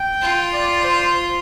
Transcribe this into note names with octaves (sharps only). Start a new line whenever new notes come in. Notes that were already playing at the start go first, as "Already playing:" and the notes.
Already playing: G5
F4
D5
C5